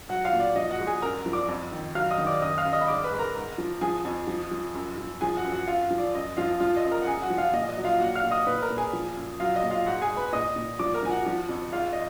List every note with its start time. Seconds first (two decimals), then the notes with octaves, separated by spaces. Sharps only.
0.09 F#3 F#4 F#5
0.24 F4 F5
0.33 A#2
0.40 D5
0.56 F3 D#5
0.71 F#4 F#5
0.79 G#2
0.87 G#4 G#5
1.02 F#2 A#4 A#5
1.26 F3
1.33 D5 D6
1.48 F2
1.72 D#3
1.95 F#3 F5 F6
2.10 D#5 D#6
2.18 D#3
2.26 D5 D6
2.42 F#2 D#5 D#6
2.58 F5 F6
2.65 F#2
2.73 D#5 D#6
2.81 B5
2.88 G#2 D5 D6
3.04 B4 B5
3.12 G#2
3.19 A#4 A#5
3.35 G#2
3.58 F3
3.81 F3 G#4 G#5
4.05 F2
4.27 F3
4.51 F3
4.74 F#2
4.98 F3
5.21 F3 G#4 G#5
5.36 F#4 F#5
5.44 F#2
5.52 F#4 F#5
5.67 F#2 F4 F5
5.91 F3
5.98 D5
6.14 F#2 D#5
6.37 F3 F4 F5
6.60 F3 F4 F5
6.77 D#5
6.84 F#2
6.91 A#4 A#5
7.02 F#5
7.07 F#2 G#4 G#5
7.22 F#4 F#5
7.30 F3
7.38 F4 F5
7.53 A#2 D#5
7.69 D#5
7.77 F#3
7.85 F4 F5
8.00 A#2 F#4 F#5
8.15 F5 F6
8.24 A#2
8.31 D#5 D#6
8.47 A#2 B4 B5
8.62 A#4 A#5
8.70 A#2
8.77 G#4 G#5
8.93 F3
9.16 F#2
9.40 F#3 F4 F5
9.56 D#5
9.63 A#2
9.71 F4 F5
9.86 G#2 F#4 F#5
10.01 G#4 G#5
10.10 G#2
10.17 B4 B5
10.33 A#2 D#5 D#6
10.56 A#2
10.79 F3 D5 D6
10.94 A#4 A#5
11.03 F3 G#5
11.10 F#4 F#5
11.26 F3
11.49 F2
11.72 G#2 F4 F5
11.93 D#5